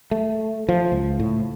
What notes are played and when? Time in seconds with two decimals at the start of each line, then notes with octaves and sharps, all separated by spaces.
0.11 A3
0.69 F3
0.92 C#2
1.20 A2